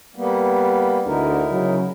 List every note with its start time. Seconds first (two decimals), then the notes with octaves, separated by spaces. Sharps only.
0.16 G3 A#3 B3
1.06 D2 D3 D#4 E4 A#4
1.51 C#3 F#3